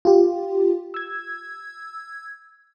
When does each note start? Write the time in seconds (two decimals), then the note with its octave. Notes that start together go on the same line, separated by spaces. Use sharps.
0.05 F4 G4
0.94 E6 G#6